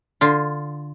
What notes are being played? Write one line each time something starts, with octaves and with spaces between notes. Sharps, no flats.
D3 F4